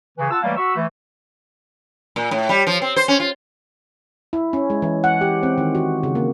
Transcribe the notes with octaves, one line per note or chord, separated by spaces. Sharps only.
C#3 E3
F4 F#5 A5 E6
E3 F#3 G3 A3 A#3
F#4 B5 C#6 E6
E3 A3
A#2
A2
G3
F3
C4
C5
C#4
F4
E4
C#4
G#3
E3
F#5
G4
C4
D#3
F#4
C#3
A#3